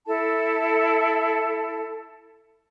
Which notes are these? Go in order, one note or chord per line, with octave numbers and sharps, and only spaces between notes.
E4 A4 A5